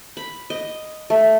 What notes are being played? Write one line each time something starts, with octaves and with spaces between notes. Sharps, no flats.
B5
D#5
A3